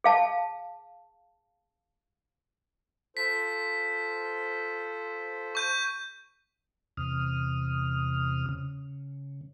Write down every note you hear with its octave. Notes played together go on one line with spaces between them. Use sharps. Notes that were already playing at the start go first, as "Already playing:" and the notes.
G#4 F5 A5
F4 A4 C5 B6
C#6 G6 D#7
E2 C3 D#6 F6
C#3